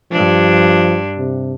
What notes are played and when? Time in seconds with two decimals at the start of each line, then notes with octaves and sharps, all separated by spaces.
0.12 G2 F3 D4
1.18 C3